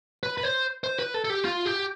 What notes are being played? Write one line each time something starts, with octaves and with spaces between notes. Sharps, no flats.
B4
B4
C5
C5
B4
A4
A4
G4
F4
G4